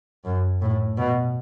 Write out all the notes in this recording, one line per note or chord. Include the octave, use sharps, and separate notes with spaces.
F#2
A2
B2